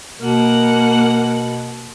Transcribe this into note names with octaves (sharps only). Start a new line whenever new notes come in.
B2 A#3 F#5